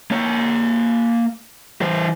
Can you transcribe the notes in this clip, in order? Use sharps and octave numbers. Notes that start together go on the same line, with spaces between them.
A#3 C#5
E3 C5